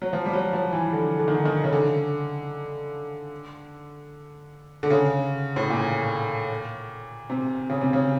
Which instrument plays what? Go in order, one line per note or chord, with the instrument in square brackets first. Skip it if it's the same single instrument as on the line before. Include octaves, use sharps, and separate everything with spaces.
[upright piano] F#3
F3
G3
F#3
F3
E3
D3
D3
D#3
D3
D#3
C#3
D3
D3
C#3
A2
A#2
C3
C#3
C3
C#3